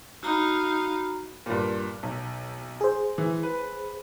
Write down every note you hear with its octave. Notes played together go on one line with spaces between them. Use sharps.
D#4 F#4 F5 A#5 B5
G2 A#2
B1
G#4 C5
E3
B4